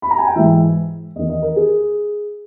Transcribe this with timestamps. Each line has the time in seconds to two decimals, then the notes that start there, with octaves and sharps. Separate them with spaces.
0.02 B5
0.11 A#5
0.18 G#5
0.27 G5
0.35 G#2 E3 E5
1.15 E2 D#3 D#5
1.29 D#5
1.42 A#4
1.56 G#4